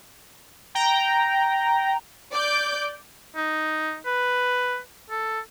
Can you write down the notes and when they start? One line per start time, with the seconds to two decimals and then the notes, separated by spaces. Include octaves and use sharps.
0.75 G5 A#5
2.32 D5 D6 G6
3.36 D#4
4.06 B4
5.10 A4